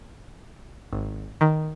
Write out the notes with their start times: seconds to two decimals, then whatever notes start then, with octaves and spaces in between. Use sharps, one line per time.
0.93 G#1
1.41 D#3